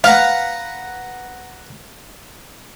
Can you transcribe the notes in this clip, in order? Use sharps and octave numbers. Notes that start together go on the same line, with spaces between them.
B4 F5 F#5 A#5